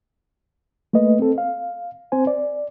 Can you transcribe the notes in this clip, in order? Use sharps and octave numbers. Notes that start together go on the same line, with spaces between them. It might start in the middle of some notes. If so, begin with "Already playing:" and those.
A3 A#3 B4 D#5
C4 A4
F5
C4 C5 G#5
D5